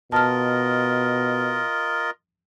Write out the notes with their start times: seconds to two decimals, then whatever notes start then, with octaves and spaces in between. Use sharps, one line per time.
0.12 B2 F4 A#4 D#5 A5 F6